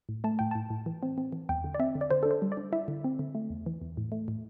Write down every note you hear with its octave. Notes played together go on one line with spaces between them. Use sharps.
A2
A3 A5
A2 G5
A2 A5
A2
E3
C4
C4
E3
E2 G5
D3
D5
C4 E5
D3
D5
D3 C5
D4 A4
C5
G3
D5
D4
E4 E5
D3
C4
D3
A3
E2
E3
E2
A2
A3
A2